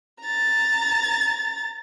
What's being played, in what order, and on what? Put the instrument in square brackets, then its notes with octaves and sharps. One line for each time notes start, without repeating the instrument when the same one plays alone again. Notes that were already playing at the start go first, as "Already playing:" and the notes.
[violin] A#5 A6